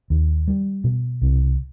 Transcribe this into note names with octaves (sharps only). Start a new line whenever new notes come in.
D#2
G3
B2
C2